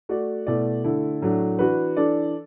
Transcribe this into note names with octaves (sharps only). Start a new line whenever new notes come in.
A3 F#4 D5
B2 A3 E4 D5
D3 A3 E4 A4
A2 F#3 A3 D4
E3 D4 F#4 B4
E3 D4 A4 D5